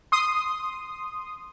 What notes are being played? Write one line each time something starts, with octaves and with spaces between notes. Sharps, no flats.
C6 D#6